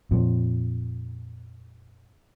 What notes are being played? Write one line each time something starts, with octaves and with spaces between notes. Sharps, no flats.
F2 A#2